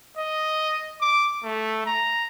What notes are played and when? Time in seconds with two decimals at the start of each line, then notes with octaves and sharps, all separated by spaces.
0.17 D#5
1.01 D6
1.44 A3
1.86 A#5